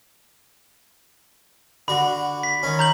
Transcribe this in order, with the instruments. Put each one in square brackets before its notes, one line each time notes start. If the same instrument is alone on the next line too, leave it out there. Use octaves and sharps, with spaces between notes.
[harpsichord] D3 F#4 [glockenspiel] B5
[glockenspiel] B6
[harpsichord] D#3 C#4
[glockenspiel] A#5 G6 F#7